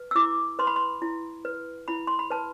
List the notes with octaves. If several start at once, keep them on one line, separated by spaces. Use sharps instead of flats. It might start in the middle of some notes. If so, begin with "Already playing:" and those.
Already playing: B4
E6
E4 D6
B4 C6
B5
C6
E4
B4
E4 B5
C6
B5
B4 A5